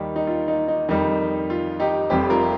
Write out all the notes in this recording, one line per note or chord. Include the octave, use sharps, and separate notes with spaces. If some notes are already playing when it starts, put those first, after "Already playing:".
Already playing: D#2 D#3 G3 D#4 G4
D#4
F4
D#4
D#4
F2 D#3 G3 D#4
F4
D#4 G4
F1 F2 C3 G3 G4 C5
F4 A#4